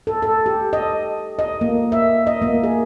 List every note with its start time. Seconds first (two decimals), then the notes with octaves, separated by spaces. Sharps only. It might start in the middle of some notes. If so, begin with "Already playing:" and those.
0.07 A4
0.22 A4
0.46 G4
0.73 D#5
1.39 D#5
1.61 A#3
1.92 E5
2.27 D#5
2.42 A#3
2.64 G#4